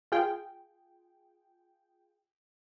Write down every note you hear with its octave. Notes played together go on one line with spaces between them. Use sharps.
F4 G#4 G5